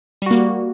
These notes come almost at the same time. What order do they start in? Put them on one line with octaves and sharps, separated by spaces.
G3 F#4 A#3